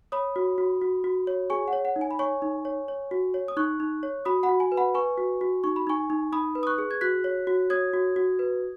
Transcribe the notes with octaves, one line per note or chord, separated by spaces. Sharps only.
C#5 B5 D#6
F#4
F#4
F#4
F#4
C#5
G#4 G#5 C#6
F#5
C#5
F#5
D#4
G#5
B5
C#5 G#5 C#6
D#4
C#5
C#5
F#4
C#5
D#6
D#4 C#6 F#6
D#4
C#5
F#4 B5 D#6
F#5 B5
F#4
G#5
B4
F#5 B5
B4 G#5 C#6
F#4
F#4
D#4 C#6
B5
D#4 G#5 C#6
D#4
D#4 B5 D#6
B4
D#6
C#6 F#6
G#4
G#6
F#4 F#6 B6
C#5
F#4
C#5 D#6 G#6
F#4
F#4
B4